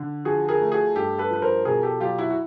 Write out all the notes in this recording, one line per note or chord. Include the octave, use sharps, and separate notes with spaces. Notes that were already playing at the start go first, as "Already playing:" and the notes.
Already playing: D3
F3 F#4 G#4
G#4 A#4
A3
F#4 G#4
G2 G4 A4
A4 B4
F3 B4
A#4 C5
B2 G#4 A#4
G4 A4
F#3 F4 G4
E4 F#4
F#4